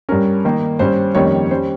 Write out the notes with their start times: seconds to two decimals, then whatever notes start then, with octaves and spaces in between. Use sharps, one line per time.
0.09 G2 G3 C#4 A#4
0.45 D#3 A#3 D#4
0.79 G2 G3 C#4 C5
1.15 F2 D#3 G3 A#3 C#4 C#5
1.51 G3 C#4 C5